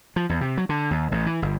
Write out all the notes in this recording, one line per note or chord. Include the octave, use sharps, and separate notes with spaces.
F3
E2
C3
F#3
D3
D#2
A1
E3
G1